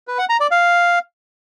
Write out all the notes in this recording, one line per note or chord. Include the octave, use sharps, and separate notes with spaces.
B4
F#5
A#5
D5
F5